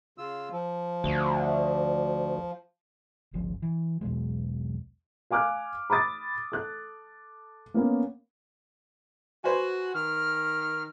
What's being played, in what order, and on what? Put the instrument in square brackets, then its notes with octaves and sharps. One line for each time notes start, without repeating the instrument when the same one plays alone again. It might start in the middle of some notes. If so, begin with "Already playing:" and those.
[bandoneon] C#3 F4 E6
F3
[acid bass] D2
[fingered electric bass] G1 C#2 C#3 F3
E3
B1 E2 B2 G#3
[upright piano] F5 G#5 D6 F6 F#6
B5 D6 D#6 A6
A4 F#6
A#3 B3 C#4
[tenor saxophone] F#4 [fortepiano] B4 C5 G#5
[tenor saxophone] D#3 [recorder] F6